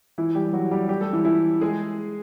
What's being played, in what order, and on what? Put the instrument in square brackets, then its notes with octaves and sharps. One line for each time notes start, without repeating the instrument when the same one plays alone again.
[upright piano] E3 E4
G3 G4
F#3 F#4
G3 G4
G3 G4
A3 A4
E3 E4
E3 E4
G#3 G#4